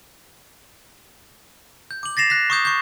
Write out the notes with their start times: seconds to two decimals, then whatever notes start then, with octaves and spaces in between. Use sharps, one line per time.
1.91 G6
2.03 D6 F#7
2.17 A6 A#6 C7 E7 F7
2.30 F#6 A#6 B6
2.50 C#6 D#6 G6
2.65 C#6 G6